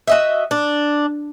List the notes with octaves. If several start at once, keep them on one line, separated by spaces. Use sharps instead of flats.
F#4 D#5 E5
D4